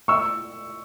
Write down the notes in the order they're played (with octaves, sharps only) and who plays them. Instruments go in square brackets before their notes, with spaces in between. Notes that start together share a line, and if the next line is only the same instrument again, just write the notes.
[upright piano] C#6 E6